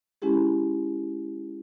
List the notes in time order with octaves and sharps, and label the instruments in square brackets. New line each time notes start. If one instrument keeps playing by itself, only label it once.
[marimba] G#3 C#4 E4 G4 G#4